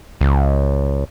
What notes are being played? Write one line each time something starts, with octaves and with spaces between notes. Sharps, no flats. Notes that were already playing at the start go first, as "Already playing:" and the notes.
C#2